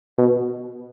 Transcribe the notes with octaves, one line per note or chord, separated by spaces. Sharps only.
B2